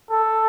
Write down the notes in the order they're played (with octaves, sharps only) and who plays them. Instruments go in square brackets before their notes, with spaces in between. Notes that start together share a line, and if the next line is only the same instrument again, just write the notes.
[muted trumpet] A4